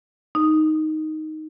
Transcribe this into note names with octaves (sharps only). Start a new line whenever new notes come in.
D#4